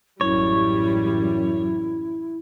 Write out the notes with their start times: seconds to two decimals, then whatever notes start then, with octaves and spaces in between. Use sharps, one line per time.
0.21 A1 F#2 G3 E4 C#5